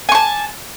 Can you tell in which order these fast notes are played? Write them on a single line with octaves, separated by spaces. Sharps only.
G#5 C#6 A5